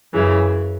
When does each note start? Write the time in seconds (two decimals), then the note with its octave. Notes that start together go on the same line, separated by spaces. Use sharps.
0.13 F#2 C#3 E3